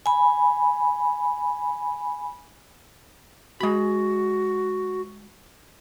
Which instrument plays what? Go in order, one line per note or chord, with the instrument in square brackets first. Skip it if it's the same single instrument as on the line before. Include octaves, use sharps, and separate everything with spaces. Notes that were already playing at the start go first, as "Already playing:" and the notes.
[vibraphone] G#5 B5
[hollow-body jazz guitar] G#3 B5 [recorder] F#4